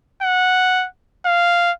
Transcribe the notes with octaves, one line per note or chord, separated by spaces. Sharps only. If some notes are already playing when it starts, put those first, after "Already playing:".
F#5
F5